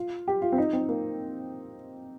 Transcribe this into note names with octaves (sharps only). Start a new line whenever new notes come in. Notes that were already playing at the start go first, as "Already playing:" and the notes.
Already playing: F4
G4
F4
C4
D#4
C4
A#3